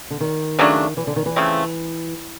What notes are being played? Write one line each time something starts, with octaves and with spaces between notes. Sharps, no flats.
D3
D#3
C#3 F#3 A3 D4
E3
D3
D#3
E3
C#3 F3 A3 C4